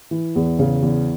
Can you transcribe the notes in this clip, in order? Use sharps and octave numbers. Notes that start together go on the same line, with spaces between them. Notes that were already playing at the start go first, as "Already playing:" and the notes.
E3
E2
C#3
E2